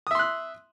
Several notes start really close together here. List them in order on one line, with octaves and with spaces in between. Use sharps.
D#6 E5 C6 F#6